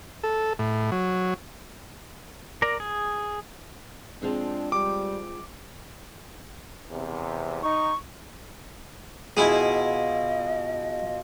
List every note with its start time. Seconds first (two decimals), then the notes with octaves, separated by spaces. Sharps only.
0.23 A4
0.59 A2
0.92 F#3
2.62 A#4 D5 A#5
2.80 G#4
4.22 F3 G#3 C4 D4
4.72 G3 D6
6.91 E2 C3
7.63 D#4 C#6
9.37 B2 E4 F4 G#4 D#5 E5